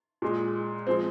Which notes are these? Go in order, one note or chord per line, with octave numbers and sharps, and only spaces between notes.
A#2 G#3
F3 G#3 C4